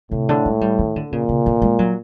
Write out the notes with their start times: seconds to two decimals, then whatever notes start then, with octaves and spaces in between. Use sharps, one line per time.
0.11 A2 C3
0.29 D3
0.45 G#3
0.61 G3
0.79 D#3
0.96 D3
1.12 A#2 C#3
1.29 C#3
1.46 D3
1.62 G#3
1.79 F#3